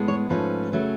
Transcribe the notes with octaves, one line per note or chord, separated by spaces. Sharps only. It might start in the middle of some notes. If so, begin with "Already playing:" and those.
Already playing: A2 G#3 B3
C#5
G#2 F3 A3 C#4 B4
C#3 F#3 A3 C#4